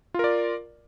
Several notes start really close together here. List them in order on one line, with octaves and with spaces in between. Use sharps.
F4 A#4 D5